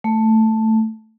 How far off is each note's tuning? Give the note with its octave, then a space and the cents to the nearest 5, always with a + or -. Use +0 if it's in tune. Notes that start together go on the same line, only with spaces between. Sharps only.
A3 +5